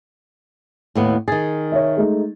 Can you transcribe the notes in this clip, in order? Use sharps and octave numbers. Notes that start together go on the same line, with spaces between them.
D#2 A2 B3
D#3 G#4 A6
C#5 E5
G#3 A3 D#4